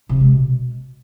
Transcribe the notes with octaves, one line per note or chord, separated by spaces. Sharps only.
C3
G#3
B2